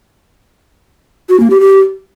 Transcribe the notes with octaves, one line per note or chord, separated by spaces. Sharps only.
F#4
A#3
G4
G4